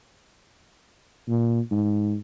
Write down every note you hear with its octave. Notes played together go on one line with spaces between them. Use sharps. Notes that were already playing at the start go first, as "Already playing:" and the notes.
A#2
G#2